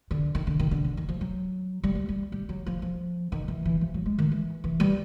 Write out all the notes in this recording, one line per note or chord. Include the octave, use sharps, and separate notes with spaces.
D3
D#3
D3
D#3
D3
D3
D#3
F3
F#3
G3
G3
G3
G3
F#3
F3
F3
D#3
E3
E3
F3
F#3
G#3
D#3
E3
E3
G3